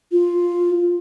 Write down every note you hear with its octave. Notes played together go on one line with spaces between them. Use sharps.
F4